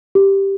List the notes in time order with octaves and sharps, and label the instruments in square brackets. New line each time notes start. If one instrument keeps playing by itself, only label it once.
[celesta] G4